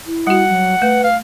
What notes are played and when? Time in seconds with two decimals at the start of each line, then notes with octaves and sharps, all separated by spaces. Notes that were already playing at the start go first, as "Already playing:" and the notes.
0.06 E4
0.27 G3 F#4 F#5
0.49 F#3
0.82 A3 B4
1.04 F5